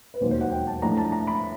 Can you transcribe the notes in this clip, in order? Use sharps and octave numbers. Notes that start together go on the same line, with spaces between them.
B4
E1 D#2 D#3 F#3 C5
C5
F#5
G5
A5
A2 F3 A3 D4 A#5
A5
A#5
B5